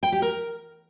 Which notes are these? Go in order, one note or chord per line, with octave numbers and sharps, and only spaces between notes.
G5
G4
A#4